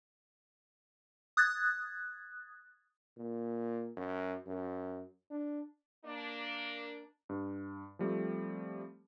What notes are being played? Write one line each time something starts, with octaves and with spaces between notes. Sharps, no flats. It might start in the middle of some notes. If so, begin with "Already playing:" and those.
D#6 F#6 G#6 A6
A#2
F#2
F#2
D4
A#3 D4
G2
F3 G3 A3 C4